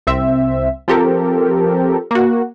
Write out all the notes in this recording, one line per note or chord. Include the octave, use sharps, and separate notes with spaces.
C2 C4 E5
F3 C4 G4 A4 A#4
A#3 F#4